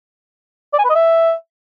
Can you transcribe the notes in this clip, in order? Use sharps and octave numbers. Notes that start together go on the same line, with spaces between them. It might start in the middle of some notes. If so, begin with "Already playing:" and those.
D5
G#5
B4
D#5
E5